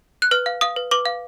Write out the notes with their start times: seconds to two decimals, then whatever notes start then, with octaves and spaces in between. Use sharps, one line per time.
0.22 F#6
0.31 B4 F6
0.46 F5
0.61 F5 D#6
0.76 B4
0.91 B4 D6
1.05 F5